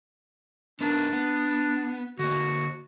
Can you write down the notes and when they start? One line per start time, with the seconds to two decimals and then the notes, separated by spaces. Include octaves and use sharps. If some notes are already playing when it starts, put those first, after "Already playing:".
0.81 B3 D4 D#4 A#4
1.13 B3
2.19 D3 A#3 F#4